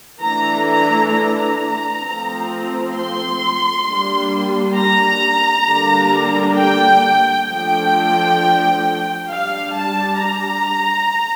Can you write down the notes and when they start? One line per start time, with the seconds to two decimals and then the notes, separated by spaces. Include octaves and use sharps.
0.21 E3 A3 D4 A#5
0.67 A#5
1.12 A#5
2.03 F3 A3 C4
2.94 C6
3.85 G3 A#3 D4
4.75 A#5
5.66 D3 G3 A#3 D4
6.56 G5
7.47 F3 A3 D4 G5
9.28 G3 D4 F5
9.73 A5
10.19 A#5